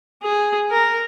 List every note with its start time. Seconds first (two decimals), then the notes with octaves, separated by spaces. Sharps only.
0.23 G#4
0.72 A#4